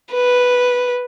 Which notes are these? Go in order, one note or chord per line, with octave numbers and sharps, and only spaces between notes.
B4